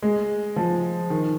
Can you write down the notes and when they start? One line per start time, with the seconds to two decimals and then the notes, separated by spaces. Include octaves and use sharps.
0.02 G#3
0.56 F3
1.10 D#3